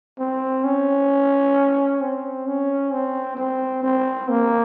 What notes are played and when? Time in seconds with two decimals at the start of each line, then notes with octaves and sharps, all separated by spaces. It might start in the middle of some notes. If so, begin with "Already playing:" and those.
0.20 C4
0.65 C#4
2.01 C4
2.47 C#4
2.92 C4
3.37 C4
3.83 C4
4.29 A#3